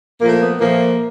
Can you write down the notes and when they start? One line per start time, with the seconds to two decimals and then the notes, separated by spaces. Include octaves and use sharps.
0.21 A#2 F3 A3 A#3
0.41 B3
0.60 A#2 F3 A3 A#3